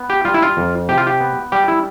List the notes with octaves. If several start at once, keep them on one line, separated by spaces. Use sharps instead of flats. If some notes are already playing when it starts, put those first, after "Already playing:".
Already playing: B3
G4
G3 F4
E4
F4
F2
C3 G4
F4
G4
B3
G3 G4
E4